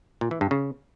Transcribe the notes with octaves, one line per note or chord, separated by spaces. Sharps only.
A#2
E3
G2
C#3